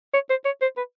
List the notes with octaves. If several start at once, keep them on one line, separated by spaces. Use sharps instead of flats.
C#5
C5
C#5
C5
B4